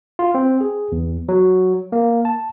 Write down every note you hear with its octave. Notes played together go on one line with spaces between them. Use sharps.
F4
C4
G#4
E2
F#3
A#3
A5